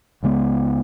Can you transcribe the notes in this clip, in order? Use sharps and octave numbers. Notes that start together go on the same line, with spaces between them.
C#2 C#3 G#3 B3